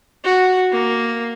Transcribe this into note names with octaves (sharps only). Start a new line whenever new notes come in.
F#4
A#3